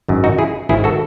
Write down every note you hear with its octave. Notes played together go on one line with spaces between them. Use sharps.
G#1 F#2 D#3
D#4 F#4
E4 G#4
G#1 F#2 D#3 E4 G#4
F#4 A4